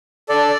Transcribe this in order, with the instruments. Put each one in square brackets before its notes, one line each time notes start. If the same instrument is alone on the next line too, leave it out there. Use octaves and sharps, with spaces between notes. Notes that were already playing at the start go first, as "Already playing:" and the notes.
[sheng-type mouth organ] D4 A4 D5